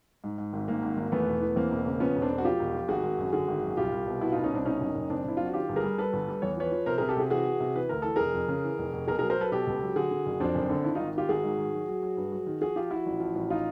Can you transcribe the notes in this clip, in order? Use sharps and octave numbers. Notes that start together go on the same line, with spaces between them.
G#2
G#2
G#1
G#2 A#3
G#1
G#1
E2 A3 B3
E1
E3
E2 A#3 C4
E1
C#3
F3 B3 C#4
E1
C4 D4
E1
F#4
F3 F4 G4
E1
F3
G#1 F#4 G#4
G#1
F#2
D3 F#4 G#4
G#1
F#2
C2 F4 G4
C2
B2
B2 E4 F#4
C2 D#4 F4
C#4 D#4
C2 C4 D4
B2 C#4 D#4
F#1
F#1
F#1 C4 D4
F#1 E4
F#3 F4
F#4
D#3 F4 G4
G1
G#4 A#4
G3
G3 A4 B4
G1
G3
E2 C#5
F3 B4 C#5
F3
C3 A#4 C5
C3 G#4 A#4
G4 A4
C3 F#4 G#4
E3 F#4 G#4
E3
C3
E3 B4
D2 A#4
E3 A4
F1 G#4 A#4
F2
C#3
E3
F1
F1
B2 G#4 A#4
F#3 G#4 A#4
A#4 C5
F#3 A4 B4
B2 G4 A4
C#2
F#3
D3 F#4 G#4
D3
F#1
F2 C4 D4
F#1
D3
D#3 D4 E4
G#1 D#4 F4
D#3 F4 G4
G#1 F#4 G#4
G#2
D#3
F#3
F#3
F#3
G2
F#3
D#3
F3 F#4 G#4
F3 F4 G4
F3 E4 F#4
A1
F3
A1
D#4 F4